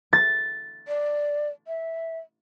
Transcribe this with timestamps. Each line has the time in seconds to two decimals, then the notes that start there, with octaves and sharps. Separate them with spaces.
0.13 A6
0.88 D5
1.67 E5